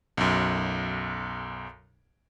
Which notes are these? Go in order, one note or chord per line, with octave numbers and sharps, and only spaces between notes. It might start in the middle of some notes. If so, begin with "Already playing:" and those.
B1 F#2